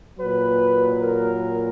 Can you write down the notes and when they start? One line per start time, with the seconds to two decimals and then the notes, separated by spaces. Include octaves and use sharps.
0.19 A#2 F#3 B4
1.00 A#4